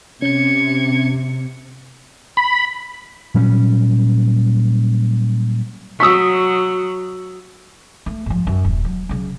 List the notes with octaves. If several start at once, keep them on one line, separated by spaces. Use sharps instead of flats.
C3 C#4 G#6 C#7
B5
A#2 F#3 G3 C#4
F#3 C#6 D#6 E6 B6
A3
G#2 F3
F#2
D#1
F#3
C#3 F#3